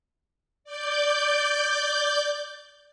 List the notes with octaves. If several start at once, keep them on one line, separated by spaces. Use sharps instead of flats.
D5 D6 G6